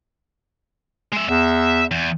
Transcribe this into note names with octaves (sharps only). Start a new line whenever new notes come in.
G#3 E5
E2 E5
E2